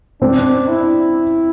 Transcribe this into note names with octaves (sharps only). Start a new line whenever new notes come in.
C4 D4
E4